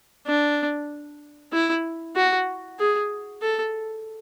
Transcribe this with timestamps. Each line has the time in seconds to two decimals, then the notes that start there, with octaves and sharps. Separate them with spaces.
0.27 D4
1.53 E4
2.16 F#4
2.79 G#4
3.42 A4